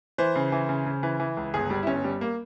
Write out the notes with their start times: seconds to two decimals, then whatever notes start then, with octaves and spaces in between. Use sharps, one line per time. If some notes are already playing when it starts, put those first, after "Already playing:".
0.18 E3 C5
0.35 C#3
0.52 E3
0.69 C#3
0.86 C#3
1.03 E3
1.20 E3
1.37 C#2
1.54 G1 G#4
1.70 G3
1.83 E4
1.87 G1 C#4
2.04 G3
2.21 A#3